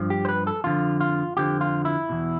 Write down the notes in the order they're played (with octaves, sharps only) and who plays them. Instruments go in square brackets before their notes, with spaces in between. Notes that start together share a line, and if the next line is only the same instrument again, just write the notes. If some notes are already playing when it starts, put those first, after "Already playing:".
Already playing: [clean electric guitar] G2 F3
G4
C5
B4
A4
F2 D3 F3 F4
F4
F2 D3 F3 G4
F4
E4
E2 B2